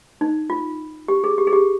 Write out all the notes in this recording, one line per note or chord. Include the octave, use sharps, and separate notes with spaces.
D#4
F4
G4
G#4
G4
G#4
G4